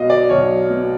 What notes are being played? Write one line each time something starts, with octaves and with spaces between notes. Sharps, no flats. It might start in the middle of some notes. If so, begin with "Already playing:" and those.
Already playing: B1 B2 D#5 F5
D5
B1 C#5
B2